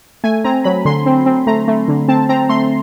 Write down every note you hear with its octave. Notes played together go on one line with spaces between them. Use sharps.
A3 G#5
C4 A#5
F#3 B5
D3 C6
C4
C4
A3 A#5
A3
D3
C4 A5
C4 A#5
A3 C6